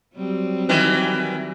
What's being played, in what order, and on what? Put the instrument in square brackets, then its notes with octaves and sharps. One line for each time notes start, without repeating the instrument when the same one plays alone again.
[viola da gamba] F#3 G3 C4
[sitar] D#3 E3